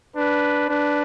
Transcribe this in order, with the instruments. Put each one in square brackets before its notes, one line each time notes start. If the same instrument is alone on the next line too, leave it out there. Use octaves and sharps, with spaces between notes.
[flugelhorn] D4 [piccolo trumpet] B4
[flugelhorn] D4 [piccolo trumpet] B4